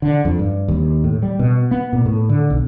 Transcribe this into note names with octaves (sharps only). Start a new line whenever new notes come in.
D3
F2
G2
D#2
A2
G3
B2
B3
A#2
A2
D3
B1